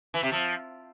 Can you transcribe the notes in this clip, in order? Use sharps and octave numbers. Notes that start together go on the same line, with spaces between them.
E3
C3
F3